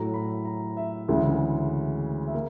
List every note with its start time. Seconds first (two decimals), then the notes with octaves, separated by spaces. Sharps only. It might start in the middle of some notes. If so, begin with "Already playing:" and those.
Already playing: A2 F#3 A3 A#5
0.14 B5
0.45 A#5
0.77 E5
1.09 D2 C#3 E3 G#3
2.27 E5
2.34 A#3